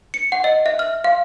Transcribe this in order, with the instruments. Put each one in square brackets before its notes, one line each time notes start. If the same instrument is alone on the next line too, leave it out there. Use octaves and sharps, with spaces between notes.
[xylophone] C#7
F#5
D#5
E5
F6
F5